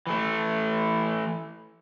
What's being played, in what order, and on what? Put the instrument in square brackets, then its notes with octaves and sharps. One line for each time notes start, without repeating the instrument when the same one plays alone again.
[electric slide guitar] E3 A3